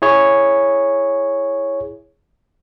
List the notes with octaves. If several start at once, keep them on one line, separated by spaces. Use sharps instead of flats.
E4 G#4 C#5